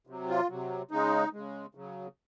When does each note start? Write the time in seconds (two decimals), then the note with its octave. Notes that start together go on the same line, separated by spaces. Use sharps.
0.07 C3 F#3
0.29 F4
0.49 C3 F#3
0.91 C#3 G#3 D#4
1.33 C#3 G#3
1.75 C#3 F#3